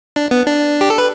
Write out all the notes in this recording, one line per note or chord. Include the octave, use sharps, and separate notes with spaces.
D4
B3
D4
G4
A4
B4